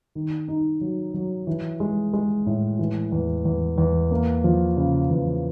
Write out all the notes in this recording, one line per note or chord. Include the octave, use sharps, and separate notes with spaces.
D#3
D#4
F#3
F#3
E3
G#3
G#3
A2
E3
E2
E2
E2
A#3
F3
C#3
E2